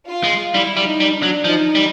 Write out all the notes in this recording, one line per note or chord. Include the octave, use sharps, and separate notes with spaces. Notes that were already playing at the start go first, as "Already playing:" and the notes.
F4
G#3
G3 E4
G3
D#4
G3
D4
F#3
F3 D#4
G3